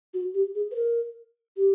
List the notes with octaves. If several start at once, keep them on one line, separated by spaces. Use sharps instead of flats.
F#4
G4
G#4
B4
A#4
G4